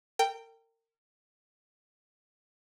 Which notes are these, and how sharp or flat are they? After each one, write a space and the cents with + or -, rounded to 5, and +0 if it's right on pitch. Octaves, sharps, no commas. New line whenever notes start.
A#4 -35 G5 +0